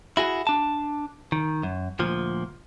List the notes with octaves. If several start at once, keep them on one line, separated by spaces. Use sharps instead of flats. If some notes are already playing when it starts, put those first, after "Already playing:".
E4 F#4 G#4
D4 A5
D#3
F#2
D2 A#2 F3